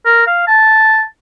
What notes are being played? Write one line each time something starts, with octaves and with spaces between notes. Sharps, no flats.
A#4
F5
A5